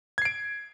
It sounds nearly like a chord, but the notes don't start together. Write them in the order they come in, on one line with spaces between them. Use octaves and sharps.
G#6 C7 D7